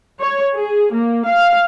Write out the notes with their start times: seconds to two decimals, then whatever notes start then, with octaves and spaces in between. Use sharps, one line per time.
0.19 C#5
0.55 G#4
0.93 A#3
1.27 F5